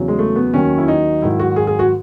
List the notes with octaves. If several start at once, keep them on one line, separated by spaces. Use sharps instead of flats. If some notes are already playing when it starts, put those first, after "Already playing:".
Already playing: E2 C#3 F#3
G#3
A3
B3
D#2 D#3 F#3 C#4
E4
D#4
G#2 D#3 F#3 E4
F#4
G#4
G#4
F#4